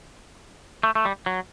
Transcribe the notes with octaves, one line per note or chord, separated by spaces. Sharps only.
A3
A3
G3
F#3